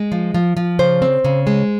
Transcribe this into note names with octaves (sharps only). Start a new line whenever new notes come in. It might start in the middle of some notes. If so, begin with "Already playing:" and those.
Already playing: G#3
F3
F3
F3
C#3 C5
C4
C#3
G#3